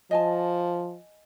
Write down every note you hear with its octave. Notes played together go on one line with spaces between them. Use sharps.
F3 D#5 G#5 A5